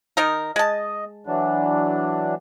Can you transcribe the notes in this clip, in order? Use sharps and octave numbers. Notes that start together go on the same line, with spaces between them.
D#3 D#4 A#4
G#3 D#5 A5
E3 F#3 D4